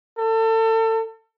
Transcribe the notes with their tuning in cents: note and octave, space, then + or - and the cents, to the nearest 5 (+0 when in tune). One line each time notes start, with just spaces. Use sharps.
A4 +30